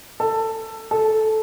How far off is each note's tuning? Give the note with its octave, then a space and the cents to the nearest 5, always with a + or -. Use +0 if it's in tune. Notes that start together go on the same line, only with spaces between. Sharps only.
A4 +15
A4 -10